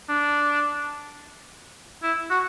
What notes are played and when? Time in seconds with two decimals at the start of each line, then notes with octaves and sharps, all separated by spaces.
0.09 D4
2.03 E4
2.30 F#4